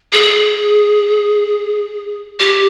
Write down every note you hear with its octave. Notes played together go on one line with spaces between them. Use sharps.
G#4
G4